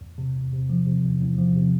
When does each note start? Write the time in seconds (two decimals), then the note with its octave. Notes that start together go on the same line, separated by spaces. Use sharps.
0.01 E2
0.18 C3
0.35 E2
0.52 C3
0.69 F3
0.87 C3
1.04 E2
1.21 E2
1.38 F3
1.56 C3